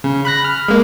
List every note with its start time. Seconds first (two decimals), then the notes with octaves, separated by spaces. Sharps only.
0.04 C#3
0.25 B5 F#6 A#6
0.45 F6
0.68 G#3 A#3